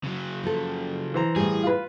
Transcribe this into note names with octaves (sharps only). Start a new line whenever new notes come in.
C#3 F#3
F3 A4
E3 C5 A#5
A2 G3 G#4
F4 B4